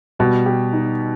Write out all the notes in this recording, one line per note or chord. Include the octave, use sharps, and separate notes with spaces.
B2 G3
G4
D#4